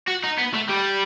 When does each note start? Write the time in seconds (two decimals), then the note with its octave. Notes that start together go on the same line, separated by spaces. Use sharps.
0.08 F#4
0.24 D#4
0.38 B3
0.54 A3
0.69 G3